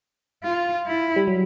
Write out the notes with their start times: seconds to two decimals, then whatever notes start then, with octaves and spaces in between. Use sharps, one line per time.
0.43 F4
0.86 E4
1.16 G3
1.28 F#3